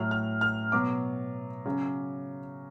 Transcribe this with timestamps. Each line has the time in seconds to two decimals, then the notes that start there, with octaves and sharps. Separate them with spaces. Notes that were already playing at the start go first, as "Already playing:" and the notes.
Already playing: A2 F#3 F6
0.11 F6
0.41 F6
0.72 B2 F#3 D6
1.66 C#3 F#3